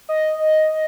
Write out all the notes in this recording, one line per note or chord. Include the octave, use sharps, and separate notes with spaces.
D#5